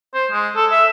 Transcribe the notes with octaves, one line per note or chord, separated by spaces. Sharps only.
C5
G#3
A4
E5